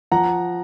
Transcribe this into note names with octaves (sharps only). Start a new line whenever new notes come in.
F3 F#5 A#5